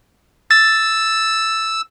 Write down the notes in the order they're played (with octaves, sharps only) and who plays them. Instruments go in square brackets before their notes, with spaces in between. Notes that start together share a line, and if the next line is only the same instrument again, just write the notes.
[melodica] E6 [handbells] A6